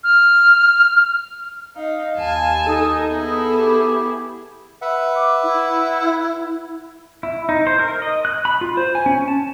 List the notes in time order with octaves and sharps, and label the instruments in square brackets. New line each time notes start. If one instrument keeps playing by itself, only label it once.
[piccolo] F6
[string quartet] D#4 [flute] F5
[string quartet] D#2 G#5 A5
[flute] D#4 [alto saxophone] A4
[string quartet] B3 E4 G#4
[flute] G4
[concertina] B4 E5 F#5
[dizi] D6
E4
[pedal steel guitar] E4
D#4
C5
A#4
D#5
F#6
B5
F4
C5
G#5
C#4
A5